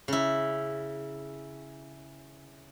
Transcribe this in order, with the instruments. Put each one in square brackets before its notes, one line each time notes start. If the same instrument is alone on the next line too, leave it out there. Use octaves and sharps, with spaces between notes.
[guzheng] C#3 E4